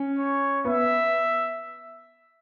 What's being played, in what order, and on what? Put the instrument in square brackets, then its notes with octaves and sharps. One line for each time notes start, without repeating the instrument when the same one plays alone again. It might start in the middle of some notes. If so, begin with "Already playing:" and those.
Already playing: [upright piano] C#4
[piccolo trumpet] C#5
[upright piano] B3 [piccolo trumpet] E5